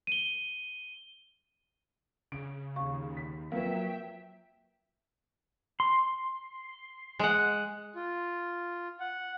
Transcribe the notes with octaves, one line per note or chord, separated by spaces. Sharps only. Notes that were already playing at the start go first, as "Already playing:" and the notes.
D#7 G7
C#3 D7
D#2 F5 C#6
B6
F3 F#3 A#3 B4 E5 F5 G5
C6
G#3 F#5
F4
F#5